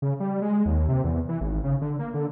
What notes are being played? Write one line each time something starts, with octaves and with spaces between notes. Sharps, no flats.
C#3
G3
G#3
D#2
C3
E2
E3
G#1
C#3
D3
A#3
D3